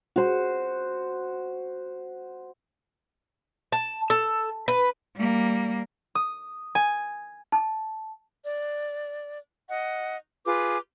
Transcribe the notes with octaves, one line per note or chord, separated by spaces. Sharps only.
F#4 C5
A5
A4
B4
G3 A#3
D#6
G#5
A5
D5
D#5 F#5
F4 G#4 B4 D6